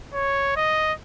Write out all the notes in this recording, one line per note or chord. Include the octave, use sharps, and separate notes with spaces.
C#5
D#5